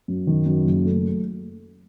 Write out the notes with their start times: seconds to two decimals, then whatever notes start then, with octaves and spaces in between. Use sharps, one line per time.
0.08 F#2
0.27 D#3
0.46 F#2
0.65 F#1
0.85 A3